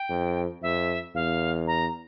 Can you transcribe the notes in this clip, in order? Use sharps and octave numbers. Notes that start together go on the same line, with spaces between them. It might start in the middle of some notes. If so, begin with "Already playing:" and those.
Already playing: G5
F2
F2 E5
E2 F5
A#5